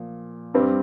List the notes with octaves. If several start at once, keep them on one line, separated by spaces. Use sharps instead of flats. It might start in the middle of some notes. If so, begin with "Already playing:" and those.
Already playing: A#2 F3
G2 G3 C4